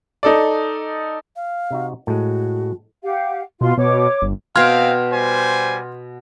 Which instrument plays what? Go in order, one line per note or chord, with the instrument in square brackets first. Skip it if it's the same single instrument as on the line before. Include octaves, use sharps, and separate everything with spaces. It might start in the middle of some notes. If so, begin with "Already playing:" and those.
[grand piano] D#4 A4 D5
[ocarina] F5
[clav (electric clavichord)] C3 D#4 F#4
[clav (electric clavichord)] A2 G#3 [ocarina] F#4
[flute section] G4 F5 F#5
[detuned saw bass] B2 [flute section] F4 F5 C6
[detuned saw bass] B2 [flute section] C#5 D6
[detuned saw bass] G1
[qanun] B2 G5 [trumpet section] C4 F5 [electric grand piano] C6 F6 G#6
[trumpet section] G3 C5 G#5